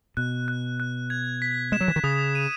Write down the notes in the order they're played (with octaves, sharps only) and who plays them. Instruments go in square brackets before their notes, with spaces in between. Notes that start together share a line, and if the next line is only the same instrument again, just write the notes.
[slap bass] B2 [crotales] F#6
[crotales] F#6
F#6
G#6
B6
[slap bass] G#3 [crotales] E7
[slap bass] F#3
E3
D#3
[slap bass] C#3 [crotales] D#6
[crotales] D#7